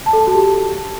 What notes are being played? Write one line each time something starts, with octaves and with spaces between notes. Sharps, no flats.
A5
A4
A5
F#4
G4